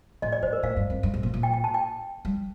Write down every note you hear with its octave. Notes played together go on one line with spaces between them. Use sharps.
A2 D#5
D5
A2 C5
A#4
A2 F5
G2
F2
G2
A2
A#2
A#2
G5
G5
A5
G5
G3